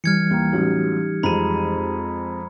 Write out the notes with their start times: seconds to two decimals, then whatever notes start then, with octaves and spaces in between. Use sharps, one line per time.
0.04 E3 G3 F6 G#6 C#7
0.31 D#2 E4 G5 A#5
0.53 A1 F#3 D#4 G4
1.23 F2 G#3 A#5 B5 D#7